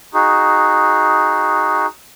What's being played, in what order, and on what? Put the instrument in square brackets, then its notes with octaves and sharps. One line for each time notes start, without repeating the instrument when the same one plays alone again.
[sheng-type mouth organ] D#4 F#4 G#4